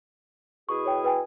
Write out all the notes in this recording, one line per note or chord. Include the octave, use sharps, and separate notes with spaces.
B2 E4 G#4 C#6
C#5 G5
B4 G5 G#5